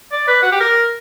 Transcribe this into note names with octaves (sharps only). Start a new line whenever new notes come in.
D5
B4
F#4
G4
A#4